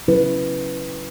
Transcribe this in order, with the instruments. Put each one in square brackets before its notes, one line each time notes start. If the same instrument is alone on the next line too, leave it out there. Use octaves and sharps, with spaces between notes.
[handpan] C#3 F#3 C#4 E4 B4